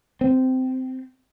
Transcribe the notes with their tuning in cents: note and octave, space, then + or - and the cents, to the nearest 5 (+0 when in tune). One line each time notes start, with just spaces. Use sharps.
C4 -15